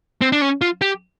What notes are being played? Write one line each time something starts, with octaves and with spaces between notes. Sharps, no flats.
C4
D4
C#4
F4
G4